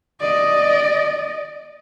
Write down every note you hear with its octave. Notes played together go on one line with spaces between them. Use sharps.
D5 D#5